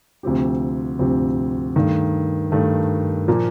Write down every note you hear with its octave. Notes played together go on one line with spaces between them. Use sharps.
D2 C3 F3 C4 G4
D2 C3 F3 C4 G4
G2 D#3 A3
G2 D#3 A3
A#2 F3 A#3